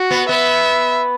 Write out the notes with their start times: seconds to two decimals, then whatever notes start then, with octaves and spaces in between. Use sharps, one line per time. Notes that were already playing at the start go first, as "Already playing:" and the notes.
Already playing: F#4
0.11 B3
0.29 B3 E5